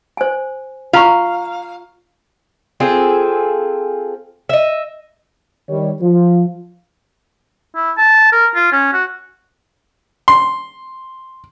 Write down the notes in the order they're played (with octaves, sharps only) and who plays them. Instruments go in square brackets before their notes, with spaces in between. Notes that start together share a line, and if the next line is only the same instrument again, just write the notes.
[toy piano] C5 G#5
[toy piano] F4 A#5 C#6 [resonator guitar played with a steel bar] F5
[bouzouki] C4 F4 G#4 A4
D#5 E5
[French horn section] D#3 G3 C#5
F3 F4
[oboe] E4
A5
A#4
F4
C#4
F#4
[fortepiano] C6